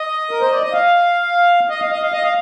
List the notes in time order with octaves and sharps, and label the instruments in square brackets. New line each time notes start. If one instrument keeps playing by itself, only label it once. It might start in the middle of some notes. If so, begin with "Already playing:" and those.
Already playing: [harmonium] D#5
A#4
C5
D5
D#5
F5
D#5
F5
D#5
F5
D#5
F5